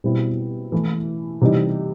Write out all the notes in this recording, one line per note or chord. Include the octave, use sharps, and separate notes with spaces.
B2 G3 C4 E4
E3 A3 E4
C3 E3 G3 D#4